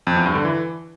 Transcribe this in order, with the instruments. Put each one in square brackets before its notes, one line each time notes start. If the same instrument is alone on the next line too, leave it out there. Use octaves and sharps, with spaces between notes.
[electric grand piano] F2
E2
G2
D3
E3